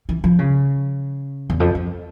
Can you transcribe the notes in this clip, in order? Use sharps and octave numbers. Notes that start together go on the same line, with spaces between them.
E3
F3
C#3
E2
F2
F2